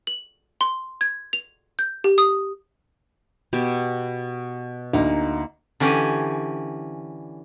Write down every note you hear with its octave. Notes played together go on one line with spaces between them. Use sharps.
F#7
C6
G#6
F7
G6
G4
D#6
B2 G4
D2 A#3 D#4
D3 E3 C#4 G4 G#5